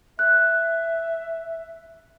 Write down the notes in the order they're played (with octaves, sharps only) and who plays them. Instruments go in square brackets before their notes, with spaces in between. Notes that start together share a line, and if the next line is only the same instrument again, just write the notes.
[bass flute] E5 [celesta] F#6